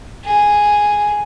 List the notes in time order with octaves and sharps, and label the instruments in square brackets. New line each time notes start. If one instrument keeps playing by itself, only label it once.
[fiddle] G#4